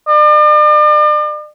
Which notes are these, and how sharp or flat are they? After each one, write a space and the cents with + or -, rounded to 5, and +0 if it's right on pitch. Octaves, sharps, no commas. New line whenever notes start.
D5 +40